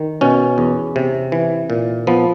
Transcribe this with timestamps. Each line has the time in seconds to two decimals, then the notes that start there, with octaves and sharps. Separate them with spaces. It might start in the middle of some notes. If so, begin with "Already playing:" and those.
Already playing: D#3
0.21 B2 C#4
0.58 E2
0.96 C3
1.32 E3
1.70 A#2
2.07 F3 B3